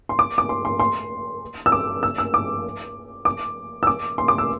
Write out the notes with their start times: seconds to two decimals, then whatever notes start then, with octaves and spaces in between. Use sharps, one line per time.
0.09 C6
0.19 D6
0.38 D6
0.49 C6
0.65 C6
0.80 C6
1.66 E6
1.72 D6
2.03 E6
2.18 E6
2.34 D6
3.25 D6
3.83 E6
3.87 D6
4.18 C6
4.28 D6
4.38 E6